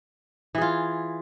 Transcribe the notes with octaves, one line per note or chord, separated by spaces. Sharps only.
E3 F4 G#4